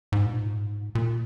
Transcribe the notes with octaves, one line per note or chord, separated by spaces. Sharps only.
G#2
A#2
G#2
A#2